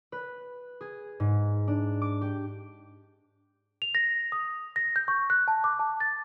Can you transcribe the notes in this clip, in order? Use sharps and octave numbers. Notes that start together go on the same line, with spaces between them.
B4
G#4
G#2
D4
D6
G4
F7
A#6
D#6
A#6
G6
C#6
F#6
A5
D6
A5
A6